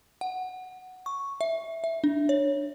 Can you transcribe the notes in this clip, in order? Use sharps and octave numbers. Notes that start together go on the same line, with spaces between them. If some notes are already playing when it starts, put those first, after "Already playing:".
F#5
C#6
E5
E5
D4
C#5